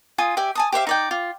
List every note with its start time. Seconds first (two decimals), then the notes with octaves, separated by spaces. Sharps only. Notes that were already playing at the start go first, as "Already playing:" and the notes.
0.18 F4 G#5 D#6
0.37 G4 D5 E5 G#5
0.55 G#5 A5 D#6
0.72 G4 C5 E5 F5
0.87 D#4 D5 G5
1.11 F4